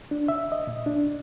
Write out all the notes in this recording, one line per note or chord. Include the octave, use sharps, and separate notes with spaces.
D4
E5
D#5
A#2
D4